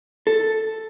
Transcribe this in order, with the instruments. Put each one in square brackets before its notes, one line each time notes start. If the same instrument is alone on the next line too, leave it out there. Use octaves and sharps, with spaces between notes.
[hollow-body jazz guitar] A4